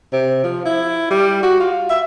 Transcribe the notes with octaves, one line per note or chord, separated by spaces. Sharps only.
C3
F3
E4
G3
F#4
F4
E5